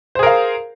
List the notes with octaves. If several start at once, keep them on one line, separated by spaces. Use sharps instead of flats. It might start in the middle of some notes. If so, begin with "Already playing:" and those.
G#4 A#4 C5 F5